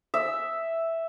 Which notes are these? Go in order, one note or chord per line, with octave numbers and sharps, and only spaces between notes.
E5